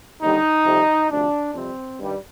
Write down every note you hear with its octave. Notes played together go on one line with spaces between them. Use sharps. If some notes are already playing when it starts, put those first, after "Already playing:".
D#2 D3 G3 D#4
F2 C3 G3
D2 C3 F3 D4
F2 C3 G3 C4
G2 D#3 G3